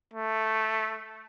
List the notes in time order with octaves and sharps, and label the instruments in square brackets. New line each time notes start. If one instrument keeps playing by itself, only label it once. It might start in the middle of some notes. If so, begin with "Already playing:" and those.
[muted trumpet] A3